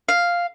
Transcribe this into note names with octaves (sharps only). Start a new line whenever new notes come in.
F5